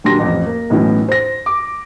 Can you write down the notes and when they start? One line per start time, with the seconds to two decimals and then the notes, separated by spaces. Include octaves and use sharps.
0.04 D#1 F#3 G3 D4 C6 A#6
0.19 A1 F2
0.46 A#3
0.70 B1 A2 E3 B3 C#4
1.09 C5 A#6
1.46 D6